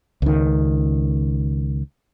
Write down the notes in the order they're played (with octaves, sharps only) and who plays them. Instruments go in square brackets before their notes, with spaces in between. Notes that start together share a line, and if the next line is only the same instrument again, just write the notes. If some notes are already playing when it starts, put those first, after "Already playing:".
[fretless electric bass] C#2 D#3